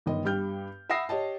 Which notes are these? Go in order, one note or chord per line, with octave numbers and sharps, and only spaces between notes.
G1 D#3 D#5
G2 G4 F6 G6
E5 F#5 B5 D#6 A#6 C7
G4 C#5 D#5 A5